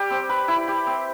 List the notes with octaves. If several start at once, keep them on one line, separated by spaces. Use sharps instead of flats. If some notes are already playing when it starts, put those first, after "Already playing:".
Already playing: G3 G4
C4
B4
E4
G4
C4